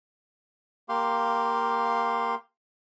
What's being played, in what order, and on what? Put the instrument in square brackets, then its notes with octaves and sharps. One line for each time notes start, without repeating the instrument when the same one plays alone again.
[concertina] A#3 G4 F5 C6